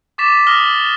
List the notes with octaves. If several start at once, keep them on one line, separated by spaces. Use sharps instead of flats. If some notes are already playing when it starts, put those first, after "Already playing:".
C#6 D6 A6 B6 E7
D#6 F6 A#6 G7